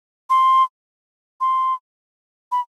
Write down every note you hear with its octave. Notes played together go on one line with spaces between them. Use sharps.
C6
C6
B5